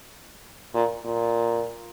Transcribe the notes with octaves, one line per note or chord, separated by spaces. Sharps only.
A#2
A#2